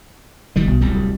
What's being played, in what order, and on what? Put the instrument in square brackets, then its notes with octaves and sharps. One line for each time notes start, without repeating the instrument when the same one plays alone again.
[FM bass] F#1 [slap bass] D#3 G3 G#3
[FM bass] B1 [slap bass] B2
[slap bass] D1 C2 G3
[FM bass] D2